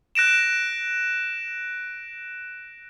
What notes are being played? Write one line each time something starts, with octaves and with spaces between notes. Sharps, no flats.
F#6 A#6 D7 E7